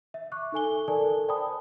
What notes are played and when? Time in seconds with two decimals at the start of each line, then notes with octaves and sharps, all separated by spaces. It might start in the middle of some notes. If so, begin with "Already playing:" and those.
0.14 E5
0.32 C#6 D6 F#6
0.52 D#4 A4 G#5 G7
0.88 A4 A#4 D5 G#5 A5
1.28 C5 D5 G5 A5 B5 D#6